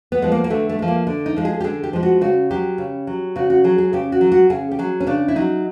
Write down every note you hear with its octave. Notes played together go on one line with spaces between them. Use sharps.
B3
F3 G#3
A#3
A#3
D3 A3
A3
F3 G#3
A#3
D3
D#4
F3 G#3
G#4
G4
D3 G#4
G4
F3 G#3
F#4
C#3 F#4
F#3 G4
C#3
F#3
C#3 F#4
F#4
F#3 G#4
G#4
C#3 G4
F#4
F#3
F#4
C#3 G#4
G4
F#3 G#4
C#4
C#3 D4
E4
F#3 D#4